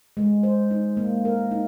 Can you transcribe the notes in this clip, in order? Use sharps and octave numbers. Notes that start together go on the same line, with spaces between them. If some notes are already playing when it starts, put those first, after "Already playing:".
G#3
C5
D#4
A#3
A#4
D#4